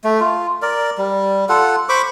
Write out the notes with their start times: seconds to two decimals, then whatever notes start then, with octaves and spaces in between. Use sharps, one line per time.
0.04 A3
0.20 F4
0.62 A#4 D5
0.98 G3
1.49 F4 A4 F#5
1.89 C5 B5 C#6 D6